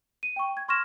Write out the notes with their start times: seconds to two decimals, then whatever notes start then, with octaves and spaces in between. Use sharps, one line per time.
0.23 D#7
0.36 G5 C#6
0.57 G#6
0.68 C6 C#6 F6 A#6 E7